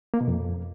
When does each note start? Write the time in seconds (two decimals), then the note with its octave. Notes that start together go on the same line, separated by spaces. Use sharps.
0.14 A#3
0.21 B2
0.28 F2